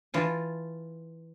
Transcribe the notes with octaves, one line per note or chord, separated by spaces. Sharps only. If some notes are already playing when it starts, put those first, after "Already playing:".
E3 F4 A5